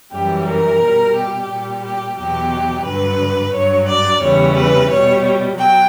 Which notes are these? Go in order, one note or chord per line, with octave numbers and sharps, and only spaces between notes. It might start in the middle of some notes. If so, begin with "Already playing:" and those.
F#2 E3 G3 G4
A#4
B2 G3
G4
A#2 G3
G4
E2 B2 F#3 G4
G2 D3 F#3 B4
G2 F#3 C#5
D5
E2 C#3 E3 G3 C#5
B4
B2 G3 C#5
F#3 G5